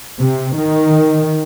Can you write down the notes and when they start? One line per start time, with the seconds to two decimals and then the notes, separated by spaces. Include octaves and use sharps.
0.19 C3
0.54 D#3